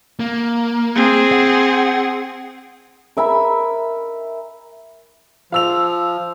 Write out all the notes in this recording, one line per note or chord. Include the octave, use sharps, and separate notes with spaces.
A#3
C4 G#4
F#5
A#4 E5 G#5 B5
F3 F5 E6 F7